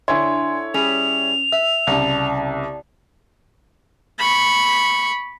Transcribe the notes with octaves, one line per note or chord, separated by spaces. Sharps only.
D3 D4 E4 C#5 G#5 C6
G3 C#4 G#4 F7
E5 E6
C2 C#3 D5 A5
B5 C#6